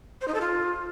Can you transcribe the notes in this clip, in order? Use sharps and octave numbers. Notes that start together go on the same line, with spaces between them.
C5
D#4
A4
F4